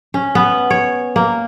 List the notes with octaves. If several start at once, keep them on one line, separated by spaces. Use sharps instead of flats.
C#4
B3
C#5
A#3